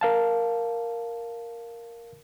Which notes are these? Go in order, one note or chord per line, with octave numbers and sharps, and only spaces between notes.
A#4 F5 A5